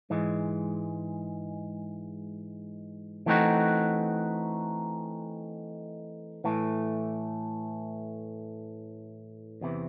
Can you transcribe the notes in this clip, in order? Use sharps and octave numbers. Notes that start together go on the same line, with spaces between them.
G#2 E3 G#3
E3 A3 C4 D#4 F#4
A2 E3 A3
E2 C3 E3